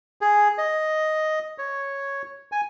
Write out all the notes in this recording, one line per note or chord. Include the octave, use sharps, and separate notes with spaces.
G#4
D#5
C#5
G#5